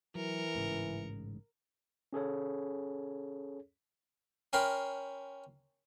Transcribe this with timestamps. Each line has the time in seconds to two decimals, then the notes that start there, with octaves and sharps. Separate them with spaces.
0.15 E3 F#3 A#4 C#7
0.55 A1 G#2 C#3
2.13 C#4 G#4 A4 C#5
4.53 C#4 A#4 G5 B5 C6